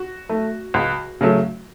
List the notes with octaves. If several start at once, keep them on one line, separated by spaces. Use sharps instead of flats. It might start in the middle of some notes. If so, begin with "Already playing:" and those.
Already playing: F#4
A3
C#2
C#3 F#3 A3